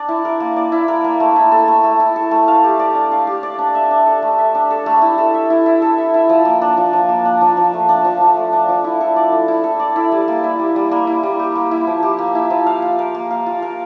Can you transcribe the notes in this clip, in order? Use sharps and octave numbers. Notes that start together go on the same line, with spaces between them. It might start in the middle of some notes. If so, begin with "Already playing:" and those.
Already playing: D4 D5
E4
A#4
A#3
D5
E4
A#4
A#3
A3
E4
A4
A3
A3
E4
A4
A3
F5
G4
D5
D4
F5
G4
D5
D4
E5
D4
A4
A3
E5
D4
A4
A3
E4
A4
E5
E4
E4
A4
E5
E4
F3
A#3
D4
F3
F3
A#3
D4
F3
F3
A3
D4
F3
F3
A3
D4
F3
E4
A4
D5
E4
E4
A4
D5
E4
G3
A#3
E4
G3
G3
A#3
E4
G3
G4
A#3
E4
F3
G4
A#3
E4
F3
F5
F4
A#4
A#3
F5
F4
A#4